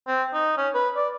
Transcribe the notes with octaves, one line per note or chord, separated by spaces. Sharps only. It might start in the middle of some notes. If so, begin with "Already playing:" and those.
C4
D#4
C#4
B4
D5